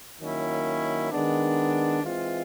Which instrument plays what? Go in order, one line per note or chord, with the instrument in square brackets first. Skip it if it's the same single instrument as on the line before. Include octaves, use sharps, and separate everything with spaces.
[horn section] D#3 F#3 A#3 C#4 E4
D#3 G#3 B3 D4
E3 G#3 C4 F4